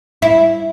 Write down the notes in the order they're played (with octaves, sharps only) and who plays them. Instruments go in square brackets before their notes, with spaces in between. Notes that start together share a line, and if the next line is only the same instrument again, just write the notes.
[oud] E4